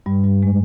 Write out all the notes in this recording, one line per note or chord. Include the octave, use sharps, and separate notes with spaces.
G2 G3
G2 G3
G#3